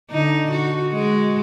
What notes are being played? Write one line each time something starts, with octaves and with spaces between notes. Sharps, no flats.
D3 D#4
F#4
G#3 F#4